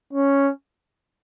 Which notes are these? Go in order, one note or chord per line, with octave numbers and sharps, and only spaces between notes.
C#4